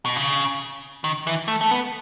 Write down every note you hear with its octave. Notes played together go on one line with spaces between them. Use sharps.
B2
C#3
D#3
E3
A3
A3
B3